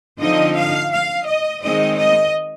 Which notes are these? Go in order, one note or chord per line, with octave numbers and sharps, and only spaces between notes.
D3 F3 C4 D#4 D#5
F5
F5
D#5
D#3 G#3 C4 D#4 D#5
D#5